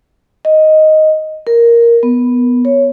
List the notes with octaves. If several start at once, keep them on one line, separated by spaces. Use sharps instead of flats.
D#5
A#4
B3
C#5